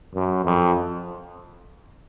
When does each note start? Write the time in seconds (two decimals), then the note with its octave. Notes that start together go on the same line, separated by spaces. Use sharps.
0.15 F#2
0.45 F2